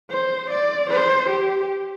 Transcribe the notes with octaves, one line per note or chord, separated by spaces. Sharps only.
C5
D5
C5
G4